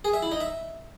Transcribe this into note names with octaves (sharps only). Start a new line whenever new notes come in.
G#4
E5
E4
D#4
E5